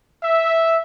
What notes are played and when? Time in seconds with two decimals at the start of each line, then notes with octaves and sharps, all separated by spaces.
0.23 E5